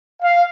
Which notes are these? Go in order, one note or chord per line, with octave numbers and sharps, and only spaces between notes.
F5